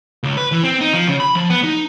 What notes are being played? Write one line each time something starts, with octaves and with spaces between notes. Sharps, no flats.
C#2
B4
E3
C4
D#4
F3
C#3
B5
F3
B3
D#4